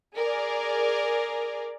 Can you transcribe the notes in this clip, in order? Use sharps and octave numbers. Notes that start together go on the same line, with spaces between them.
G#4 A#4 D5